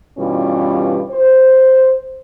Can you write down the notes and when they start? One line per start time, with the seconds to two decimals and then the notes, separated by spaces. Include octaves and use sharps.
0.18 G2 B2 E3 G3 C#4 F4
1.11 C5